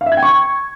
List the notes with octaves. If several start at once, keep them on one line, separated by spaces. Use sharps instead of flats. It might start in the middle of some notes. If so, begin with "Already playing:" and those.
F5
E5
G#6
G5
C#6